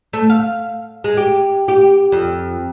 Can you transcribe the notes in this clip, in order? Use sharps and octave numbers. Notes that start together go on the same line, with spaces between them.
A3
F5
G#3
G4
G4
F2